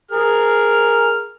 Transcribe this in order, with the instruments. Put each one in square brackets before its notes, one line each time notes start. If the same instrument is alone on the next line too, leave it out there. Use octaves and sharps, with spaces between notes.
[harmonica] G#4 A#4 [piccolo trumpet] F6